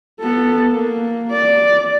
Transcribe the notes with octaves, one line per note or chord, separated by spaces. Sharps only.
B3 A4
A#3
D5